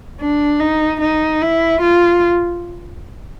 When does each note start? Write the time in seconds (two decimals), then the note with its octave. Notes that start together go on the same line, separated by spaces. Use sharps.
0.20 D4
0.60 D#4
1.01 D#4
1.42 E4
1.82 F4